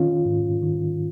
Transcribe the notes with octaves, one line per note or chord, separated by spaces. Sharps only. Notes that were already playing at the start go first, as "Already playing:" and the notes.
Already playing: D#3 C#4 F4
G#2
D#3